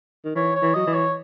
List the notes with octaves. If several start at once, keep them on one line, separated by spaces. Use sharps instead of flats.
D#3
E3 C#5
C#5
E3
F#3 D#5
E3
C#5